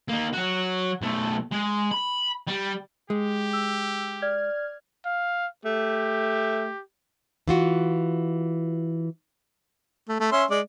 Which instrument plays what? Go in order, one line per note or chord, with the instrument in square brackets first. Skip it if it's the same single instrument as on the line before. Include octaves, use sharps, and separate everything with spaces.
[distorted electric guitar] A#3 D#4
F#3 F#4
B1 A3
G#3
B5
G3
[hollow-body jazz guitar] G#3 [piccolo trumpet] G4
[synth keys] E6
D5 F6 G#6
[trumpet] F5
[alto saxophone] A3 [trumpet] G4
[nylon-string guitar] E3 F4 F#4
[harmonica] A3
A3
C#4 E5 C6
G#3 D5